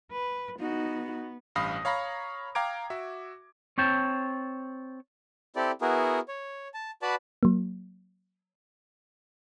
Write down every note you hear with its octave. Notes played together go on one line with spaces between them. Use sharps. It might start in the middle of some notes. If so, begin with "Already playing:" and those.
B4
B3 D#4 F#4
A1 G2 F5 B5 D#6 A#6
C#5 F5 A#5 B5 C#6 A#6
F5 G5 A#5 D6 G#6 D7
F#4 E5
C4 C#5 G5 A5
C4 E4 G4 A4 D5
B3 E4 F#4 G#4 A#4
C#5
A5
F#4 B4 D5 A5 B5
F#3 A#3